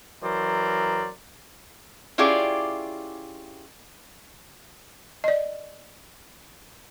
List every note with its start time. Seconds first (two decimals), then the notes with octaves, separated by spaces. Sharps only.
0.23 E3 F#3 A#4 C5 D5
2.18 C#4 E4 F4 G4 G#4 D5
5.24 D5 D#5